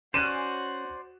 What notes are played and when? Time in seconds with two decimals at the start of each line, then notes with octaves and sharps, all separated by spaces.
0.14 C#4 F#4 C5 D5 F#6 D#7 E7